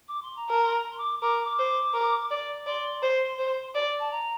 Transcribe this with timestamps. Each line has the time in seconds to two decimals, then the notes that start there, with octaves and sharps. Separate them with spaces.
0.08 D6
0.22 C6
0.36 A#5
0.49 A#4 A5
0.63 C6
0.74 A#5
0.91 C6
0.98 D6
1.22 A#4 D6
1.45 D6
1.59 C5
1.94 A#4
2.31 D5
2.66 D5 C6
3.03 C5
3.39 C5
3.75 D5
3.99 A5
4.11 A#5